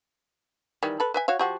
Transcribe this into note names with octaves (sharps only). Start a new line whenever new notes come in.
D#3 E3 G3
A4 B4
B4 E5 G#5
F#4 C#5 F5
F3 F#4 G4